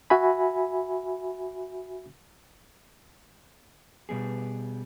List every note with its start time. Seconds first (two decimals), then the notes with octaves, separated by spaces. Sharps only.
0.10 F#4 E5 G#5 B5
4.09 B2 G3 B3 G#4